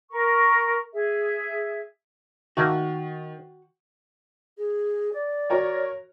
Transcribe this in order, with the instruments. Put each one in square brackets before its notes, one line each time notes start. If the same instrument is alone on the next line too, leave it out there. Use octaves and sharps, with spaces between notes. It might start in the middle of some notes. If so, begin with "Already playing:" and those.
[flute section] A#4 C#6
G#4 E5
[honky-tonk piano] D#3 [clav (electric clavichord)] A3 A#3 [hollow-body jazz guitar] F#4
[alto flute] G#4
D5
[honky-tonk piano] F#4 A#4 C#5